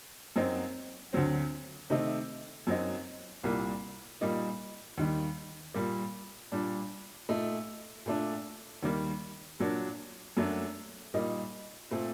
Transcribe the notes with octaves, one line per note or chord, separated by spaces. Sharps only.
F#2 F#3 C4 D#4
D2 D3 F#3 C4
C3 D#3 A3 D#4
F#2 F#3 C4 D#4
C2 A#2 G3 A#3
A#2 G3 A#3 D#4
D#2 D#3 G3
A#2 G3 A#3
A#2 G3 D4
A#2 A3 D#4
A#2 A3 D4
D#2 D#3 G3 A#3
A#2 F#3 A#3 D4
F#2 F#3 A3 D4
A#2 G3 A#3 D#4
A#2 A3 C4